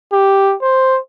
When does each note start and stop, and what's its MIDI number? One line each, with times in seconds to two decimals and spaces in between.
0.13 0.55 67
0.62 0.99 72